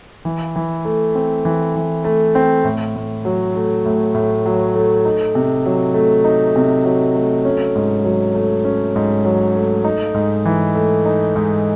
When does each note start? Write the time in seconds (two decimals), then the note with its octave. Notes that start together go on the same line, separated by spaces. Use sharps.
0.25 E3
0.56 E3
0.85 A3
1.15 C4
1.45 E3
1.75 E3
2.04 A3
2.35 C4
2.64 A2
2.96 A2
3.25 F#3
3.56 A3
3.85 A2
4.14 A2
4.46 F#3
4.75 A3
5.05 D#4
5.35 C3
5.66 F#3
5.94 A3
6.24 D#4
6.56 C3
6.84 F#3
7.15 A3
7.45 C#4
7.75 G#2
8.04 F#3
8.34 A3
8.65 C#4
8.96 G#2
9.25 F#3
9.54 A3
9.84 D#4
10.14 G#2
10.45 E3
10.75 A3
11.06 D#4
11.36 G#2